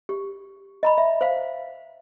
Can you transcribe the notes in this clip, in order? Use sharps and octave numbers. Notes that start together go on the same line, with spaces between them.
G4
D#5 A#5 B5
E5
C5 F5